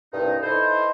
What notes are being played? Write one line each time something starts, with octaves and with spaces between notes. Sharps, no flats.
C2 G2 D#4
D#4 E4 A4 B4 C5